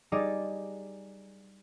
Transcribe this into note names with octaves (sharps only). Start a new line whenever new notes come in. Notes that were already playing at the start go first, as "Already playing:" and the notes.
G3 D#4 G#4 D5